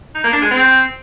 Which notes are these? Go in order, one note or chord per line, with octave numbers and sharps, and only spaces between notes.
D#4
A#3
D4
G#3
C4